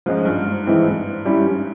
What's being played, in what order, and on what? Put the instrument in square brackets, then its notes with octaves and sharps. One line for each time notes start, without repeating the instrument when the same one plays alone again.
[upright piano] G#2 [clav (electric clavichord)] F3 G#3 C#4
[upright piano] G2
G#2
[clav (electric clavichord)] E3 G#3 C4 E4
G3 C#4 E4